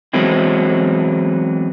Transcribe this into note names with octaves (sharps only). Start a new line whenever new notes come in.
E3 F#3 G#3 B3 C4 E4